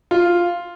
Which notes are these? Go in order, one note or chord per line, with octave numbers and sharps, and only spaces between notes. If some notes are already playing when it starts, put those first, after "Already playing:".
F4